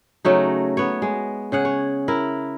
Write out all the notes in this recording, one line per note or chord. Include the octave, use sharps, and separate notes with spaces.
C#3 F#3 A3 D#4
B3 C#5
G#3
C#3 G#4 F#5
C#5
E4 A#4